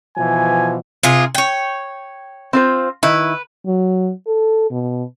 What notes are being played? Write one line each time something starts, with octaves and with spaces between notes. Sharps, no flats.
B2 E3 F3 G#5
C3 F4 G#4
C#5 G5
C4 F4 C5
D#3 E4 B4
F#3
A4
B2